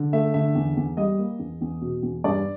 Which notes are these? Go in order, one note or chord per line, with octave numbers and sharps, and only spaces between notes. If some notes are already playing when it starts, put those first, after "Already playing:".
Already playing: D3
A3 E5
D3 E5
E2
E2
G3 D#5
A#3
E2
E2
B2
E2
G2 D5